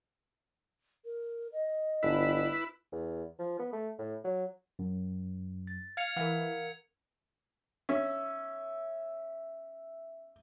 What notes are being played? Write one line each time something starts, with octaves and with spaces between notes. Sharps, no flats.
A#4
D#5
G1 E4 B4
E2
F3
B3
A3
A2
F#3
F#2
A6
F5 G#6 C#7 F7
E3 A#4 F5 F#5
C#4 E5